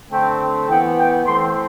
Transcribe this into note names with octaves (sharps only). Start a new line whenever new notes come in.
D3 A3 C4 G5
E3 B3 G5
G5
E3 A3 C4 C6